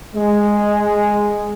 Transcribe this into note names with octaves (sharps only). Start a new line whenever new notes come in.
G#3